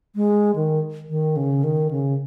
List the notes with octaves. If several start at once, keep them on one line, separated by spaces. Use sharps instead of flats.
G#3
D#3
D#3
C#3
D#3
C#3